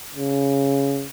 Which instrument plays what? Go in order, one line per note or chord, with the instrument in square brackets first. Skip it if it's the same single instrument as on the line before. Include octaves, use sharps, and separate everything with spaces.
[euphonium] C#3